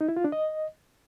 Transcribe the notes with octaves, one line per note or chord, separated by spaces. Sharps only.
D#4
E4
F4
D4
D#5